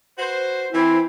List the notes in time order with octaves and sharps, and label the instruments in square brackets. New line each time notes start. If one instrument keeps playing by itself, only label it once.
[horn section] F#4 B4 C5
[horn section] E3 C4 [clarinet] E4